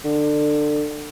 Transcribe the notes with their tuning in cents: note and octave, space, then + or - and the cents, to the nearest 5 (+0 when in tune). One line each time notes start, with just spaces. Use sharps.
D3 +20